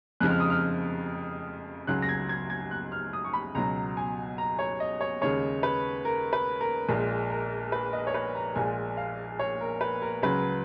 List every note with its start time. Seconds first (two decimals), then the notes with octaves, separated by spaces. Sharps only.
0.20 F2 C#3 F3 G#3 F#6
0.30 F6
0.40 D#6
0.50 F6
1.87 C#2 C#3 F#3 F#6
2.02 A#6
2.09 G#6
2.29 G#6
2.50 G#6
2.71 F#6
2.92 F6
3.13 D#6
3.25 C#6
3.33 B5
3.55 C#2 B2 F#3 A#5
3.97 G#5
4.38 A#5
4.59 C#5
4.80 D#5
5.01 C#5
5.22 D#2 C#3 G#3 C#5
5.63 B4
6.05 A#4
6.33 B4
6.61 A#4
6.89 A#1 A#2 G#3
7.30 A#4
7.72 B4
7.93 D#5
8.07 C#5
8.14 B4
8.35 A#5
8.55 A#1 A#2 F3 G#3 G#5
8.97 F5
9.39 C#5
9.60 A#4
9.81 B4
10.02 A#4
10.22 C#2 C#3 F#3 B4